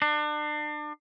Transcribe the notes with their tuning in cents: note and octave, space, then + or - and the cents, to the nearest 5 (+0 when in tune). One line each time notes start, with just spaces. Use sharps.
D4 +35